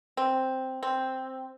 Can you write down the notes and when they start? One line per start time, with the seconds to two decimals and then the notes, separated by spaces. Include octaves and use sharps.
0.17 C4
0.83 C4